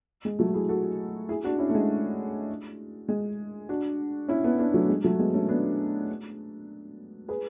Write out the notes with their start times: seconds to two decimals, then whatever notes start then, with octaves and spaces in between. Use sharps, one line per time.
0.25 G#3
0.39 F#3 A3
0.54 E4 G#4
0.69 F#4 A4
1.29 E4 G#4
1.44 D4 F#4
1.59 C#4 E4
1.70 A3
1.75 G#3
3.09 G#3
3.69 D4 F#4
4.28 C#4 E4
4.44 B3 D4
4.59 B3 D4
4.74 F#3 A3
4.89 G#3
5.04 F#3 A3
5.19 G#3 B3
5.34 A3 C#4
5.49 B3 D4
7.28 G#4 B4